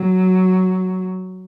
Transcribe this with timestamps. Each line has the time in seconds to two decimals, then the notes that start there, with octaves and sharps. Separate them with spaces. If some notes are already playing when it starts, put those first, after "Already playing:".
Already playing: F#3